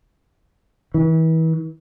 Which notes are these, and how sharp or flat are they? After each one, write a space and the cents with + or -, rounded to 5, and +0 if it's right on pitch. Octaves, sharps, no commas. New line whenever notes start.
E3 -35